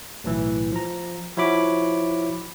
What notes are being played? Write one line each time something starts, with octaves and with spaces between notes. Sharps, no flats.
B1 A2 E3
F3 A#5
F3 E4 F#4 C#5 B5 D6